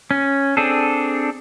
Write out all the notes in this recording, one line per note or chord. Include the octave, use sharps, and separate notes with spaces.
C#4
C4 D4 G#4 A4